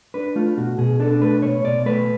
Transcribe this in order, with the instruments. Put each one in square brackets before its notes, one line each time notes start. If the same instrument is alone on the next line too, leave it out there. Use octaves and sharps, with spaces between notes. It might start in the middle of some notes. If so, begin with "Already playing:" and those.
[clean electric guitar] D4 B4
A3 F4
B2 F#4
B2 G#4
D4 A4
A3 B4
B2 C#5
B2 D5
A3 B4